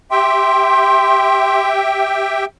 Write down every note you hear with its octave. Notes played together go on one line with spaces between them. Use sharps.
G4 E5 G5 C6